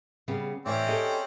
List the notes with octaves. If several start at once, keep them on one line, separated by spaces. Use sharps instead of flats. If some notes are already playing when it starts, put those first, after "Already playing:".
C#3 G3 B3
A2 E3 C4 C#4 D5
G4 A4 D#5